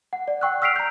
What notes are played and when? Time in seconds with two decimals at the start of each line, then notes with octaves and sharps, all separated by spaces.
0.13 F#5
0.28 D5
0.41 F#5 G5 C#6 E6 F#6
0.62 E6 F6 B6 C7 D7 F7
0.76 A#5 G6